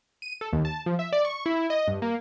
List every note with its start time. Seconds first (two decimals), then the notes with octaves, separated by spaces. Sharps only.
0.22 D#7
0.41 A4
0.53 D#2
0.65 A5
0.86 F3
0.99 E5
1.13 D5
1.25 C#6
1.46 E4
1.70 D#5
1.88 G2
2.02 A#3